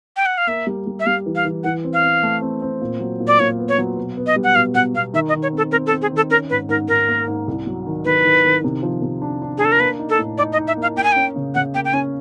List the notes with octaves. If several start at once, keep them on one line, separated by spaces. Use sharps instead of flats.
G5
F#5
F5
A#3 E5
G3
G3
E5
G3 F5
E3
F5
E3
E3 F#5
C4
F5
C4
A3
C4
C4
A#2
F#3
A#2
D5
A#2 C#5
B3
C#5
F#3
B2
B3
D#5
G3
F#5
B2 F5
B2 F#5
B2 F5
D#3 E5
D#5
D#3
C#5
C4 A4
C4 A#4
A4
C4
G#4
D#3 A4
C#4 A#4
G#2 B4
G#2 A#4
G#2 A#4
A#3
G#2
C2
F#3
D#3
D#3 B4
D#3
D#3
C3
F3
C3
D4
D4
G#4
D4 A4
A#4
A#3 B4
D#4
A4
A2
D#4 D5
D#5
D#4
E5
A#3 F5
A#3 G5
G#5
C#4 G5
C#3
C#3 F#5
A#3 G5
G5
C#4 G#5